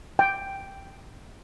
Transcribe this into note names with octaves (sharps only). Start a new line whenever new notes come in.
G5